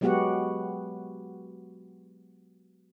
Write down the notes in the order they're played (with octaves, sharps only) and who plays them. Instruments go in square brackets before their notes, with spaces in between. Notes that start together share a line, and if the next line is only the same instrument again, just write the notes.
[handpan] F#3 G#3 B3 F#4 G4 F#5